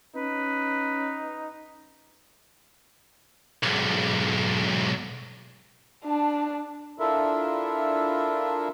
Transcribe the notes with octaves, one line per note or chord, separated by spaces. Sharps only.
C#4 D#4 B4
B1 G#2
D4 A5
D4 E4 F4 A4 A#4 E5